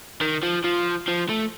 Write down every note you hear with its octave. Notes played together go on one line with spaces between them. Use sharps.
D#3
F3
F3
F3
A3